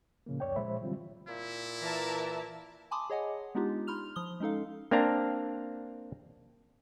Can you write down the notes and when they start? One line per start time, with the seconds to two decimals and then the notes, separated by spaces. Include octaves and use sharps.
0.26 A2 C#3 F3 A#3
0.40 C#2 F#2 C#5 D5 G5
0.56 A#2 F3 G#3 C5 E5 B5
0.81 D3 E3 F#3 G3 C4 F4
1.28 A#2 E4
1.82 E3 A#4 E5 A5
2.91 G#5 A5 B5 C6 D6 D#6
3.10 G#4 C#5 D#5 F#5 G#5
3.55 G#3 B3 D4 D#4 F4 G4
3.87 D#4 B5 C6 F6 F7
4.16 F3 D#6 G7
4.40 G#3 C#4 D#4 A4 F5
4.91 A#3 C4 D4 F5 A#5